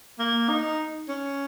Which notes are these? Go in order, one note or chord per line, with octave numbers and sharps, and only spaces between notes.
A#3
D#4
C#4